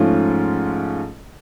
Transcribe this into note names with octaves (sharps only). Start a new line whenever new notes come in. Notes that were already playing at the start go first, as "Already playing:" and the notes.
Already playing: G#2 F3 A3 C#4 F4